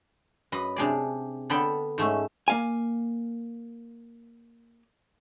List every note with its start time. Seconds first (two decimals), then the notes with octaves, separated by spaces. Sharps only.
0.52 F#2 B4 D#5
0.76 C3 D4 G#4 D5
1.50 D3 B3 A4 G5 B5
1.98 G#2 A3 C#4 E5
2.48 A#3 F5 G#5